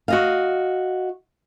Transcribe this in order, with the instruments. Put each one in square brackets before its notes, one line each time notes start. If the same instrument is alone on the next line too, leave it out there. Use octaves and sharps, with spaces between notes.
[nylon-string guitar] F#4 D#5 F5